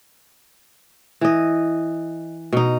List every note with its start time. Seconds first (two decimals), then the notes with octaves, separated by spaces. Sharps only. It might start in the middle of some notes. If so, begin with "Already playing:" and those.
1.21 E3 D#5
2.53 B2 D#4